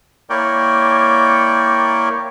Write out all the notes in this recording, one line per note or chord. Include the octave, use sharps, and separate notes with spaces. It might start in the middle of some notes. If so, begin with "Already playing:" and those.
A#3 E4 A#4 C#5 D5 G5